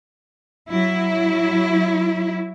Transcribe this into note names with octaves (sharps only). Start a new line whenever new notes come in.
F#3 E4